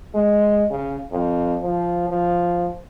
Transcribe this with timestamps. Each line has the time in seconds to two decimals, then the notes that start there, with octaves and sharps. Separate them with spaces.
0.14 G#3
0.71 C#3
1.12 F2
1.63 F3
2.09 F3